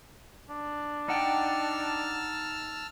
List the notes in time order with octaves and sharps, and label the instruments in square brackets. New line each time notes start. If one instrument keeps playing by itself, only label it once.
[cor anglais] D4
[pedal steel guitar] D#4 F#5 G5 [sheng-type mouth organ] A5 E6 F6